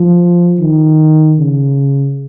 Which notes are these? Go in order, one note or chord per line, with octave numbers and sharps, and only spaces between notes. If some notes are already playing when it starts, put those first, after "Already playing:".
Already playing: F3
D#3
C#3